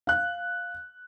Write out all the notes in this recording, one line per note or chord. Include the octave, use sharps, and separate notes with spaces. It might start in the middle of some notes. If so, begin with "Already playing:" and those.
F5 F#6